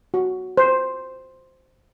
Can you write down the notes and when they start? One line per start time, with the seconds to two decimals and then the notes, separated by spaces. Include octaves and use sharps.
0.14 F#4
0.57 C5